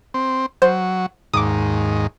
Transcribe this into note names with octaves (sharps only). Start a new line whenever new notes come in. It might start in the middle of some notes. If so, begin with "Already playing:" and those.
C4
F#3 C5
D#2 G#2 D6 D#6